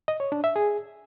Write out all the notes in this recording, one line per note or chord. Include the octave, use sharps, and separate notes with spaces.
D#5
C#5
D4
E5
G#4